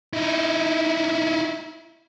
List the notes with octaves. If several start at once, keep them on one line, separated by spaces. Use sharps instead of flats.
D#4 E4